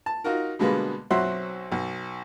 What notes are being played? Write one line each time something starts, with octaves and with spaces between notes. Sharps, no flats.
A5
D#4 F4 F#4 A#4
B2 D3 G3 G#3 A#3 B3
B1 F#3 C4 E5 F#5 C6
B1